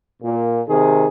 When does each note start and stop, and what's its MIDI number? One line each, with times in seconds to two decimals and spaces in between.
0.23 0.60 46
0.67 1.06 48
0.67 1.06 51
0.67 1.06 68